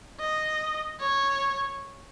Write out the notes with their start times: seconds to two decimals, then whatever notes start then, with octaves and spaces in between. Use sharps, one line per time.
0.20 D#5
1.00 C#5